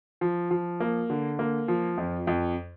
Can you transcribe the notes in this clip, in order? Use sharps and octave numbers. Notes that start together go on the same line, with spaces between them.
F3
F3
A#3
D3
A#3
F3
F2
F2